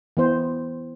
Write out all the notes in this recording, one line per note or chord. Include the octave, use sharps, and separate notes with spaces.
E3 B3 C5